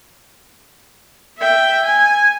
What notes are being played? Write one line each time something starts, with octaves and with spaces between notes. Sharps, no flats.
E5 G5
G#5